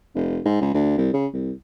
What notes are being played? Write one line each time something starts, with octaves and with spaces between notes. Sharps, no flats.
F1
G#2
C#2
D2
C2
C#3
C2